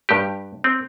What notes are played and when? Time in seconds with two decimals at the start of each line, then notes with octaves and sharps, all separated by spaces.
0.09 G2 G4
0.64 C4